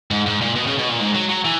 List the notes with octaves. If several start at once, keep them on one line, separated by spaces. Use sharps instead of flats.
G#2
G#2
A#2
B2
C#3
B2
A#2
G#2
F#3
F#3
E3